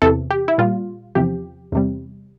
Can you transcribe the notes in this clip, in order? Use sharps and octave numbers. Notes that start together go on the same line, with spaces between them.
E2 C3 E3 A4
G4
E4
A#2 G3 F4
E2 C3 F3 G4
E2 C3 G3